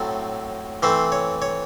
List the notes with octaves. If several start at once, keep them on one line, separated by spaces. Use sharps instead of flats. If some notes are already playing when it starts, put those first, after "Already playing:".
Already playing: A2 F#3 C4 A4
E3 A3 C4 C5
C#5
C#5